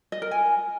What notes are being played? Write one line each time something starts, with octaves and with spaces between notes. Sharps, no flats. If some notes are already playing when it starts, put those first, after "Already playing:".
D#5
A#4
G#5